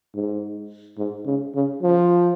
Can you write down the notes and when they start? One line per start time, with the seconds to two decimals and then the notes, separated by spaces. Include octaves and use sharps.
0.15 G#2
0.98 G#2
1.26 C#3
1.55 C#3
1.83 F3